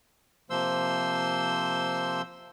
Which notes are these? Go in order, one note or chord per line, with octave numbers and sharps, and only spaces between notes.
C3 F3 A#3 C5 C6 E6